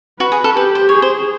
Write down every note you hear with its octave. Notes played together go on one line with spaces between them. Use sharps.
F#4 B4
G#4
A4
G4 B4
C5
G#4 C#5
C5